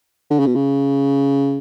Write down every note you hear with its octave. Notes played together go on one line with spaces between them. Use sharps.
D3
C#3
B2
C#3